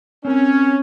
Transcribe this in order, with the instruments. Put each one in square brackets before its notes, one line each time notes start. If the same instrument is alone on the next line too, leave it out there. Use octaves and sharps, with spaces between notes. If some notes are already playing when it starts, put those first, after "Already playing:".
[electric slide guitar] C4 A#4 [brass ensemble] C#4